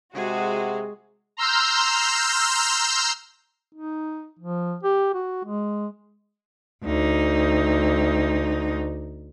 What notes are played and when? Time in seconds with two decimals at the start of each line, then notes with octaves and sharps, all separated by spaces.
0.15 C3 G#3 F#4 G#4
1.37 A#5 C6 E6 F6 G6
3.75 D#4
4.39 F3
4.83 G4
5.14 F#4
5.45 G#3
6.84 D2 D#4